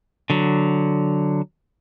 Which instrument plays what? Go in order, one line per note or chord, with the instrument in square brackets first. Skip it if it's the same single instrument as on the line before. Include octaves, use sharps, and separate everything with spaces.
[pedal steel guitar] D3 F#3